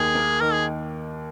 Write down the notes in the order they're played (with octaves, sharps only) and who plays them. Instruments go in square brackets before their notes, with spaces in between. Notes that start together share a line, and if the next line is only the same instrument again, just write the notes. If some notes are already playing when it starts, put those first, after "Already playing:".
Already playing: [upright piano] D#2 [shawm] G#4
[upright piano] A#3
[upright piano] D#3 [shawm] A#4
[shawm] G#4